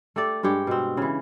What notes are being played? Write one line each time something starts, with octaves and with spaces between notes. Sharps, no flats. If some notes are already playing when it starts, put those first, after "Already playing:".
A3 G4 A4 D5
G2 G#3 G4 C#5
B2 C4
C#3 E3